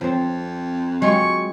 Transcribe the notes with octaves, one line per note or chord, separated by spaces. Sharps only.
F2 F3 C4
F#3 G#3 F4 G4 C#6